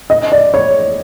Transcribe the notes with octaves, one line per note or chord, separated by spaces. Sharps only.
D#5
D5
C#5